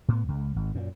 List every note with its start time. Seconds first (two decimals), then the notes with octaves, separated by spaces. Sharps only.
0.08 A2 B3
0.28 C#2
0.56 G#1
0.75 F#2 A#2